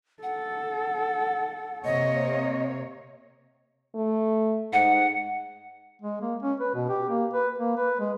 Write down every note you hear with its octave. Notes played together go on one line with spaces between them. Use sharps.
A4 F#5
C3 A#3 C#5 D#5
A3
G#2 F#5
G#3
A#3
C#4
B4
B2
G4
A#3
B4
A#3
B4
G#3